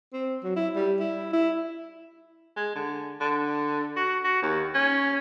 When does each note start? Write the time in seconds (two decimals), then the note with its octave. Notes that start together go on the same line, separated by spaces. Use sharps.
0.13 C4
0.44 F#3
0.56 E4
0.76 G3
1.00 E4
1.33 E4
2.56 G#3
2.75 D3
3.21 D3
3.96 F#4
4.24 F#4
4.42 D#2
4.74 C#4